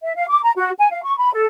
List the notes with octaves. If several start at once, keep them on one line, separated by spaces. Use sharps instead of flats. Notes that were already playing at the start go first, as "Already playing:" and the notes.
E5
F5
D6
A#5
F#4
G#5
F5
C#6
B5
A4